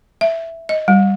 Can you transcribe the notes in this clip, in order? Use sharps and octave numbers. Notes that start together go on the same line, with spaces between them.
E5
D#5
G3